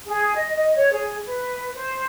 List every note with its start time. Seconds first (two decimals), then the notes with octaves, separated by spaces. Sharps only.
0.07 G#4
0.35 D#5
0.56 D#5
0.75 C#5
0.93 G#4
1.25 B4
1.74 C5